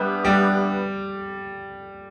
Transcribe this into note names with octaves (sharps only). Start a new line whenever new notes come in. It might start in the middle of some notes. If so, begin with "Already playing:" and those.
Already playing: G3 B3 D4 G4 B4 E5
G3